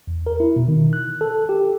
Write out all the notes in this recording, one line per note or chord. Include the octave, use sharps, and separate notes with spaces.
E2
A#4
E4
B2
D#3
F#6
A4
G4